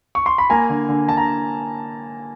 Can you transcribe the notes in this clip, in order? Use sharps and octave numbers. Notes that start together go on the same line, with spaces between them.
C#6
C6
B5
A#3 G#5 A#5
D3
D3
D3 A5
A#5